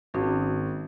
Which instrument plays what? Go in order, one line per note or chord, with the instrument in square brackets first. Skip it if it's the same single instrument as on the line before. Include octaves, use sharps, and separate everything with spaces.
[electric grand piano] G#1 [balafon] C#4 F#4